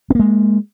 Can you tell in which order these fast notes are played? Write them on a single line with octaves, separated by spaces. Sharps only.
C4 A#3 G#3